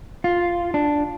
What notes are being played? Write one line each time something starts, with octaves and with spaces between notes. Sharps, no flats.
F4
D4